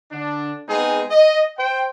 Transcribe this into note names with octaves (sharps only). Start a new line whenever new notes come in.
D3 D4
G#3 B3 C4 D#4 G#4
D#5
C5 G5